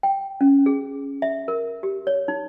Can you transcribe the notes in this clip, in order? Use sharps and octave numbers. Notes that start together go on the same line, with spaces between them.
G5
C#4
G#4
E5
A#4
G4
C#5
D#4